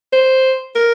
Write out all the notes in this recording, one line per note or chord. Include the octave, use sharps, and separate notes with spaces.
C5
A#4